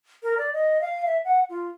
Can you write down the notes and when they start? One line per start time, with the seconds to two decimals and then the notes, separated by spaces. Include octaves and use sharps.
0.23 A#4
0.38 D5
0.53 D#5
0.81 F5
1.06 E5
1.25 F#5
1.50 F4